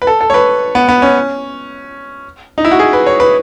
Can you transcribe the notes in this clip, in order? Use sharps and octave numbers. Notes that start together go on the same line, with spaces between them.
B4
A4
A4
C#5
B4
B3
B3
C#4
D#4
E4
F#4
G#4
B4
C#5
B4